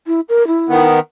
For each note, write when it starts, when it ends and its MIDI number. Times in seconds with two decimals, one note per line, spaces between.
0.07 0.20 64
0.29 0.46 70
0.47 0.87 64
0.69 0.99 51
0.69 0.99 59